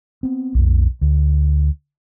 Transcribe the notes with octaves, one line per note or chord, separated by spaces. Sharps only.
B3 C4
B1 F2
D2